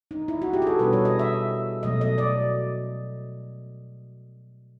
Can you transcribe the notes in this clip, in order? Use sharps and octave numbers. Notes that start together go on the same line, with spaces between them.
D#4
E4
F#4
G4
G#4
A4
B2 G3 B3 D4 B4
C#5
D#5
E5
B2 F#3 A3 D#5
D#5
D5